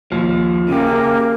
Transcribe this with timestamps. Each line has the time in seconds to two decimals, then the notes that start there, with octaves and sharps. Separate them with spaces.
0.12 D#2 F3
0.68 C#3 A#3 G4